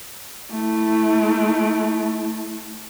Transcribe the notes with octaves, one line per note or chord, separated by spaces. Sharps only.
A3 E4